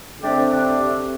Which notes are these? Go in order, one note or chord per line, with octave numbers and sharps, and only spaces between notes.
D3 A3 C4 D4 G4
D4 G4
C3 A3 C4